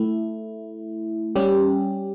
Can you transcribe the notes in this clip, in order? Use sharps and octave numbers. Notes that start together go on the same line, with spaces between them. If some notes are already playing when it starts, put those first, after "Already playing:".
Already playing: A3 E4
G3 C#4 G4